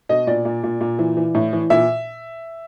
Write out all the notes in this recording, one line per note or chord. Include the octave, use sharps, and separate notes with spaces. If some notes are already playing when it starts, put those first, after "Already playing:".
B2 D#5
A#2 D5
A#2
A#2
A#2
E3
E3
A2
E3
A#2 E5